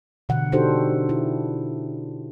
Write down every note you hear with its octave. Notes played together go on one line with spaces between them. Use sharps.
B2 D3 E3 F#5
D4 D#4 F#4 G4 A4 C5
E4